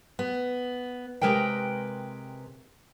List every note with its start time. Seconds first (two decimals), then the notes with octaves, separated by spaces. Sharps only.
0.19 B3
1.21 C3 D#3 G#3 A#4 B4 G5